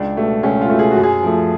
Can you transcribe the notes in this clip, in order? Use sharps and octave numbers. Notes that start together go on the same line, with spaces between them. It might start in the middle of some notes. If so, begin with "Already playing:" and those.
Already playing: C#2 D4
B2 A3
C#2 C#4
F4
B2 A3
G#4
F#4
F#2
G#4
F3 A3